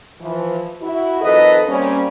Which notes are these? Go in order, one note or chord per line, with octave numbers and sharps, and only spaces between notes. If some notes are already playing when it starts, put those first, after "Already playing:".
E3 F3
E4 F#4
F2 D#3 A4 B4 D#5
G3 A#3 C4 C#4